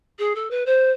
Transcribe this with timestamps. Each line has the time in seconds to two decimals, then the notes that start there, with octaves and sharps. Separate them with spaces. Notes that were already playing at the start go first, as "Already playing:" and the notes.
0.19 G#4
0.35 A4
0.51 B4
0.66 C5